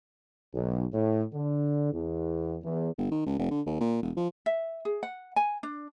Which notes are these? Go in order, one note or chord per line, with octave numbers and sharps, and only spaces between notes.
B1
A2
D3
E2
E2
G1
D#3
C#2
F1
D3
D#2
A#2
E1
F3
E5
G#4
F#5
G#5
D4